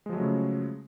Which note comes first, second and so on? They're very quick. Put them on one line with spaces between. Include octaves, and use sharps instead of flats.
G#3 F3 F#3 A3 C#3